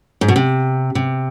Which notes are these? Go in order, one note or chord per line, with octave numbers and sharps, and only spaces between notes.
G#2
B2
C3
C3